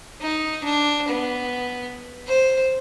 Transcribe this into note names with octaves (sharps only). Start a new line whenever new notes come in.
D#4
D4
B3
C5